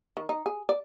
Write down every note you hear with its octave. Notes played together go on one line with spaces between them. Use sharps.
D#3
D#4
G#4
D5